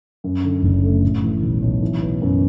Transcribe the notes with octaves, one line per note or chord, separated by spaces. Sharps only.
F#2
D3
F#1
A3
A2
E3
B1
B1
E3
B3
F#2